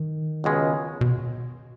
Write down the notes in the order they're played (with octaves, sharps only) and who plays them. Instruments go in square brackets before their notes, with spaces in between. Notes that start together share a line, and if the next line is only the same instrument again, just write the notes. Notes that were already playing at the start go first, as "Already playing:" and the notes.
Already playing: [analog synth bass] D#3
[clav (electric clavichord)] C#2 B2 G#3 C#4
[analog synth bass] B2